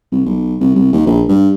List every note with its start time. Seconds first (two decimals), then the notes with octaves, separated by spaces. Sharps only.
0.12 C2
0.26 B1
0.60 C2
0.76 C2
0.93 D#2
1.07 A#1
1.28 G2